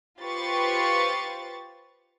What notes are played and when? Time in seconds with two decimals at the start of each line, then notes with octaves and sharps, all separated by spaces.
0.21 F4 G4 B4 C5 C#6 A6